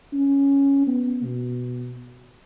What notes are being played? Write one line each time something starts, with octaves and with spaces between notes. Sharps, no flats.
C#4
B3
B2